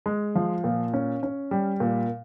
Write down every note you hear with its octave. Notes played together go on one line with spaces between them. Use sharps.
G#3
F3
A#2
C#4
C#4
G3
A#2